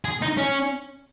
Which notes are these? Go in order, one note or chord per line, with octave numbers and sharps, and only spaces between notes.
G#4
D#4
C#4